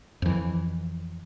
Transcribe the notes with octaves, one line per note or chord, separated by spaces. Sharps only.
F2 E3